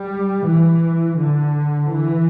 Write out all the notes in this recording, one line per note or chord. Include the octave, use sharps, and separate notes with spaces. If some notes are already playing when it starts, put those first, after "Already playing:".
Already playing: G3
E3
D3
E3